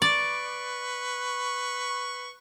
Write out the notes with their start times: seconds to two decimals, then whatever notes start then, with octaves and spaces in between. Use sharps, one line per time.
0.02 B4 D5 C#6